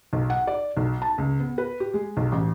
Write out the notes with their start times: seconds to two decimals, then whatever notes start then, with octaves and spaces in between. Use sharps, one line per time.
0.13 B1
0.30 F#5
0.47 D5
0.77 B1
1.02 A5
1.18 C#2
1.40 B3
1.58 B4
1.80 G4
1.94 G#3
2.17 B1
2.32 A1